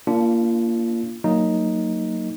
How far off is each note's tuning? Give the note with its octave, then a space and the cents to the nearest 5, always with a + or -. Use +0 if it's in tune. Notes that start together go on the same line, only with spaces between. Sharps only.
A#3 +0 D4 -15 F4 -30
F#3 +0 A#3 -15 D#4 +0